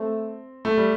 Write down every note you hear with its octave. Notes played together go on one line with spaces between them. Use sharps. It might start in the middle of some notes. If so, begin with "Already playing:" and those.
Already playing: A3 C4
A3
G3